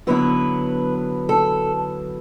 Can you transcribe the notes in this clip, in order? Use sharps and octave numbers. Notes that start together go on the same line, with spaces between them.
D3 F#3 B3 E4 B4
A4